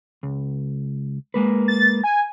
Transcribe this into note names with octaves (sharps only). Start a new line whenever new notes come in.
C#2
G#3 A#3 B4
A6
G#5